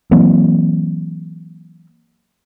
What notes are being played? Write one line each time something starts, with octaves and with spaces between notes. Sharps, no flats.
E3 F#3 A#3 C4